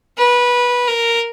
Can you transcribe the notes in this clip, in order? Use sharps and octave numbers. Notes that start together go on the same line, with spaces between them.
B4
A#4